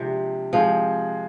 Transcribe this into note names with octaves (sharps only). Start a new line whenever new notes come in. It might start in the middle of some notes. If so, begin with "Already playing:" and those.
Already playing: C3 F3 G#3 D4
F3 G#3 C4 G#4